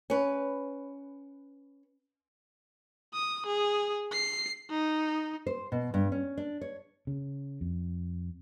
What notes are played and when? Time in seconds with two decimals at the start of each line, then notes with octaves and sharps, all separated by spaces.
0.10 C#4 B4
3.14 D#6
3.46 G#4
4.12 C7
4.70 D#4
5.46 C5
5.72 B2
5.94 G2
6.12 C#4
6.37 D4
6.61 C#5
7.07 C#3
7.61 F2